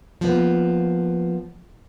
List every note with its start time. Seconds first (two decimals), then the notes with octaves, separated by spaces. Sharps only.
0.21 F3 A#3 B3